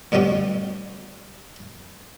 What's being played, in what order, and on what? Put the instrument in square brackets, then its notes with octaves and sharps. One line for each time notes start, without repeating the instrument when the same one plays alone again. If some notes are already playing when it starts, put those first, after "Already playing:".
[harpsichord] D2 G2 B2 C#4 G4